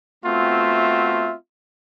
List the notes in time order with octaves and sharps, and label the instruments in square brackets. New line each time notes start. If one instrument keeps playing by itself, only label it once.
[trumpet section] A3 B3 C4 F4 F#4 E5